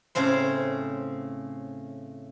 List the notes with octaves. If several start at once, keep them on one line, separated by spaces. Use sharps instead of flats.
A2 C#3 C4 C5